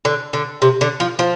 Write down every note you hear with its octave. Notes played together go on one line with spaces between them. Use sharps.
D3
D3
C3
D3
F3
F3